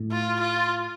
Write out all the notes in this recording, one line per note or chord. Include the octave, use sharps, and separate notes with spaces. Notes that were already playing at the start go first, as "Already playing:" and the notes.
Already playing: A2
F4
F4